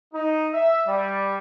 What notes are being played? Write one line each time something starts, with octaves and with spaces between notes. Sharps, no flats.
D#4
E5
G3